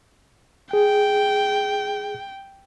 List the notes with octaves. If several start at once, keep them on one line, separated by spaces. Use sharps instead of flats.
G#4 G5